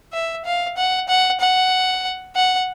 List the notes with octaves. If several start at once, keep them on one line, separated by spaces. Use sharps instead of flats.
E5
F5
F#5
F#5
F#5
F#5